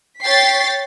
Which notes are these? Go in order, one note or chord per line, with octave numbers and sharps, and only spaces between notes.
C#5 G5 A6 B6 C7